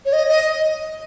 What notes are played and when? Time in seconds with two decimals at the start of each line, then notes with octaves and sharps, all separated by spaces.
0.05 C#5
0.13 D#5
0.29 D#5